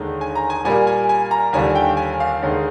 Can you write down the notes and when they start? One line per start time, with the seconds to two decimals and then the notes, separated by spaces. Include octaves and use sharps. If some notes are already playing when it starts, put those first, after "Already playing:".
Already playing: D#2 D3 G#3 D#4
0.21 G#5
0.35 A#5
0.50 G#5
0.65 A#2 G3 A#3 G#5
0.87 G#5
1.09 G#5
1.31 A#5
1.53 D#2 D3 G3 D4 F4 G#5
1.75 G5
1.97 G#5
2.20 F5
2.42 D#2 D3 G#3 D#4